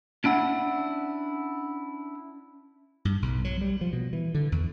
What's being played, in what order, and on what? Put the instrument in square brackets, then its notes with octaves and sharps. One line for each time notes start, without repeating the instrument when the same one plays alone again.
[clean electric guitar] C#4 D4 E4 F#5
[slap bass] G2
B1
F#3
G3
F3
B2
E3
D3
E2